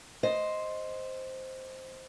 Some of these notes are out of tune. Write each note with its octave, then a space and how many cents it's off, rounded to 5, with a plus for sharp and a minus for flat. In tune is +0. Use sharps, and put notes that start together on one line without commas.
C5 +0 D#5 +0